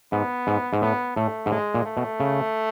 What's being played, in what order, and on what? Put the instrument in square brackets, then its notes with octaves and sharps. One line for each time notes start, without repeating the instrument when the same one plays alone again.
[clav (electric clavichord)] G#2 [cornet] B3
[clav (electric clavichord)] G#2
G#2
[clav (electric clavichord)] A2 [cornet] B3
[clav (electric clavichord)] A2 [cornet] A3
[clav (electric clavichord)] G#2
[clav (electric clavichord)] A2 [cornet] G#3
[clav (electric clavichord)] A#2
[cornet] A3
[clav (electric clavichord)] B2
C#3